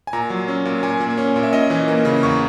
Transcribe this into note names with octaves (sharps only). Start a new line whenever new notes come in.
G#5
A#2 A#5
F#3
C#4
A#2
A#2 G#5
A#3
C#4
A#2
E5
C#4 D#5
E3
A#3
C#3
E2 C#6